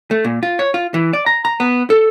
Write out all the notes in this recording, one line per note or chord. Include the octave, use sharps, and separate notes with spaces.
A3
A#2
F4
C#5
F4
E3
D5
A#5
A#5
B3
A4